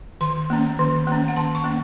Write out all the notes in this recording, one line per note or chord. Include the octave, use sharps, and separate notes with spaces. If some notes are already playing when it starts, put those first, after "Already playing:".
D#3 C6
A#3 C#4
D#3
A#3 C#4
F#5
D#3 A5
C#6
A#3 C#4